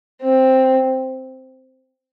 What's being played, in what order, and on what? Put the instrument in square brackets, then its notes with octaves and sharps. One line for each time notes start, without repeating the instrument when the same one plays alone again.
[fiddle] C4